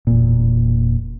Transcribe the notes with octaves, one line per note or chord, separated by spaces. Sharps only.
E1 A#2